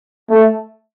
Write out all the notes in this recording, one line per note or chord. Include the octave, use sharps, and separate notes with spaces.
A3